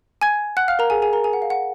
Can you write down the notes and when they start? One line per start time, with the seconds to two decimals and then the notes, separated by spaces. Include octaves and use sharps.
0.22 G#5 G#6
0.57 F#5 F#6
0.68 F5 F6
0.79 A#4 A#5
0.90 G#4 G#5
1.02 G#4 G#5
1.13 A#4 A#5
1.24 G#4 G#5
1.33 F#5
1.42 F5
1.50 F#5